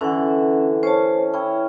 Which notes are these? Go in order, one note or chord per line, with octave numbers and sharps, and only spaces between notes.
D3 E3 C#4 A4 F#5
C#4 C5 C#5 A5
C#4 E4 G5